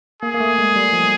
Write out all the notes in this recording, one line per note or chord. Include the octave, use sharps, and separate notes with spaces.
A#3 G#4
A#3
A3
G#3
G3
F3